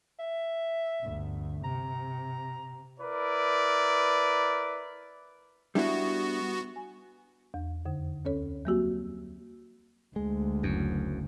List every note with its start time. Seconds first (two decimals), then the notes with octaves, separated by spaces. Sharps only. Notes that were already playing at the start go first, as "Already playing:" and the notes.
0.19 E5
1.02 G1 D2
1.64 C3 A#5
3.00 E4 A#4 B4 D5
5.75 G3 B3 D4 E4 F#4
6.76 G#5
7.54 E2
7.86 F2 D3
8.25 D2 C#4 A4 C#5
8.65 F#3 G3 A#3 C4 F#4 G4
10.16 D2 G#3
10.63 F#1 F#2